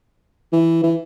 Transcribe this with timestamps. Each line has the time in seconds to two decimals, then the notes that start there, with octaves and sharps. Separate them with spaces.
0.53 E3
0.84 E3